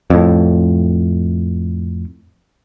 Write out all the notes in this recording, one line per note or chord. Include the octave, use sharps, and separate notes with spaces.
F2 A2